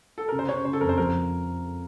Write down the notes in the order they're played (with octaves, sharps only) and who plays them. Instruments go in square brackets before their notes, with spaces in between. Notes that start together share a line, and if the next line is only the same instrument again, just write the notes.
[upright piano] A4
[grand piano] C#3 [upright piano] A#4
[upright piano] C5
[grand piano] C#3 [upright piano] C#5
[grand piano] C#3 [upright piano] C5
[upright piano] A4
[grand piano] F2 [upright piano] A#4
[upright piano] C5
[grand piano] F3 [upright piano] A#4